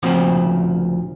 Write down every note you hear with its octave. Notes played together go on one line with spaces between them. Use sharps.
D2 A#2 C#3 F3 C4